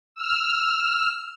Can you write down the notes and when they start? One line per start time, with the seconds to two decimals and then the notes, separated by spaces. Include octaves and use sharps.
0.15 E6 F6